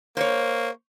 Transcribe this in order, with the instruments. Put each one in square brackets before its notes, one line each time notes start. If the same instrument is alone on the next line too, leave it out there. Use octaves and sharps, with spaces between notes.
[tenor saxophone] A#3 [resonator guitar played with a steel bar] C5 C#5